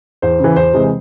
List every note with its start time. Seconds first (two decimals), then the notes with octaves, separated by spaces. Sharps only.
0.22 E2 C5
0.39 C#3
0.44 E3
0.56 E2 C5
0.73 C3 E3 G#3